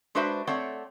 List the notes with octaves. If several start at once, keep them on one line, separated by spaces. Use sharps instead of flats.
G#3 D4 F#4 B4 C5 E5
A3 C4 C#5 D5 F#5